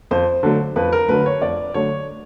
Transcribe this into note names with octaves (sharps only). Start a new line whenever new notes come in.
F2 C5
D3 F#3 A3
F2 B4
A#4
D3 F#3 A3 B4
C#5
F2 D5
D3 F#3 A3 C#5